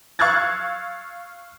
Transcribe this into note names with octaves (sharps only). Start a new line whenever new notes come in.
F5 C#6 E6 F#6 G#6 A6